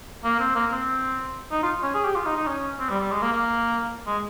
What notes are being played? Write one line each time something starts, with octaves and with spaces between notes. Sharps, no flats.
A#3
C4
A#3
C4
D#4
F4
C#4
G#4
G4
F4
D#4
D#4
C#4
C4
G3
G3
G#3
A#3
A#3
G#3